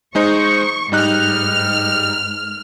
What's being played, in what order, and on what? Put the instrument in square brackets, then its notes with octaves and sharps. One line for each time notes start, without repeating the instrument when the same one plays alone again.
[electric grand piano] G#3 D#4 C5 [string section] C#6
[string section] G#2 F6 [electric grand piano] G3 D#4 F#6